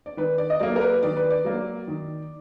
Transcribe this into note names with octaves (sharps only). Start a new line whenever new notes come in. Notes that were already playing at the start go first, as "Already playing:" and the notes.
D5
D#3 B4
D5
D#5
F#3 A#3 D5
A#4
B4
D#3 D5
B4
D5
F#3 A#3
D#3